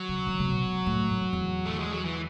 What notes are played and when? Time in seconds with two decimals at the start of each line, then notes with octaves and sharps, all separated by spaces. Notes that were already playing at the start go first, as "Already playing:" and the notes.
Already playing: F#3
0.08 C#3
0.27 C#3
0.39 C#3
0.45 B2
0.86 A2
1.09 F#2
1.33 E2
1.66 A3
1.79 G#3
1.92 F#3
2.05 E3